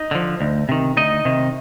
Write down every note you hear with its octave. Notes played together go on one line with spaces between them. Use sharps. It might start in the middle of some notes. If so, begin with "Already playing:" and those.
Already playing: D#4 D#5
D3 F3
D2
C3 D#3
D2 D#4 D#5
C3 D#3